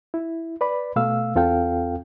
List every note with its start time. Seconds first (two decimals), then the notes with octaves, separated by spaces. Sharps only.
0.14 E4
0.61 B4 D5 B5
0.96 B2 A3 F5 E6
1.35 E2 C4 F4 A4 F5 G5